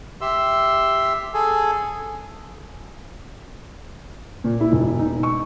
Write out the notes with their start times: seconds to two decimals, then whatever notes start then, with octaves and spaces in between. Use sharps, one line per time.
0.21 G4 E5 C6 E6
1.34 G#4 A4 G#5
4.44 A#2
4.60 E4
4.72 E1
4.99 D#4
5.23 C#6